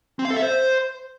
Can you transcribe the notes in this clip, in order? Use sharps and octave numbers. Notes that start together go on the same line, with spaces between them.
C4
F5
A4
E5
C5